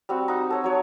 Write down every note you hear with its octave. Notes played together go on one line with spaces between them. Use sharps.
G3 C4 F#4
D#4 F#5
A4 C#5
F#3 C#5